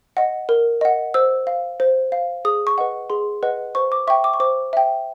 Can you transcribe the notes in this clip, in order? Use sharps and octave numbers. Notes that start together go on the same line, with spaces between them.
D#5 F#5
A#4
D#5 F#5
C5 E6
F5
C5
F5
G#4 D#6
C#6
B4 D#5 F#5
G#4 C6
B4 D#5 F#5
C5 C#6
D6
E5 G5 C#6
D6
C#6
C5 D6
E5 G5